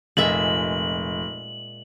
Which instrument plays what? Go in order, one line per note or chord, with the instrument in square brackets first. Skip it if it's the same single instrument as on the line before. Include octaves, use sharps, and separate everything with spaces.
[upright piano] F1 [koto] A#2 G#3 E5 [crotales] F#7